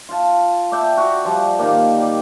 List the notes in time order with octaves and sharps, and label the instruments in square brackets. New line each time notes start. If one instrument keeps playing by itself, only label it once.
[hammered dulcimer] F4 A5
D5 E5 G5 A5
F#4
F3 G3
D#3 G3 A#3
G3